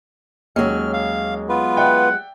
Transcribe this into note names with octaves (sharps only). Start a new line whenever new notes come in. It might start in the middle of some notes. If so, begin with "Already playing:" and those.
D#2 F#3 G#3 C#4 F6
F5
B3 F4 B4
D5 E5 F#5 G5